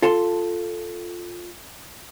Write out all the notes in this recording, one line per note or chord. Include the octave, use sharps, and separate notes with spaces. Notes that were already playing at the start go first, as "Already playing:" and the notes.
F4 A4 A5 C6